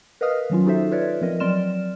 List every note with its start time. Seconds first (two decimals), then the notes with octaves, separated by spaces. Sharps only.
0.21 A#4 B4 D#5 F5 D#6 F6
0.50 D#3 F#3 C#4 F4
0.66 D#4 F#4 A4 C5 E5
0.91 F4 B4 C#5 D5 E5
1.21 F3 C4 A#4 D#5
1.40 F#3 C4 D5 C6 F6 E7